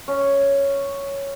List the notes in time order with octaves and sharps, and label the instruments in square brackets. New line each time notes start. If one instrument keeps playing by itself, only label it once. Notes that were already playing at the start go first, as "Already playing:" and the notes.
[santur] C#4